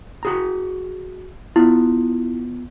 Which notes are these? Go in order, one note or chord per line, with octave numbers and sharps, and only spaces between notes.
F#4 G#4 A#5
B3 E4 F4